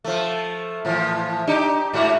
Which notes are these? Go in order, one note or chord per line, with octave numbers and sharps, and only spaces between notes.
F3 A3
A2 E3 F3
D4 D#4 G4
G#2 F#4